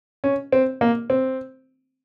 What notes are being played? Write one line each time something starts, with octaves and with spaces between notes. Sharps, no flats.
C#4
C4
A#3
C4